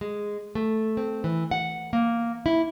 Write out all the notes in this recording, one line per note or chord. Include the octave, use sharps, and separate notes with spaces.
G#3
A3
C4
E3
F#5
A#3
E4